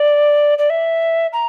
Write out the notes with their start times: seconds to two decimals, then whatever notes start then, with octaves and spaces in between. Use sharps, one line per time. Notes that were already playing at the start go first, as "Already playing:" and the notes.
Already playing: D5
0.58 D5
0.70 E5
1.33 A#5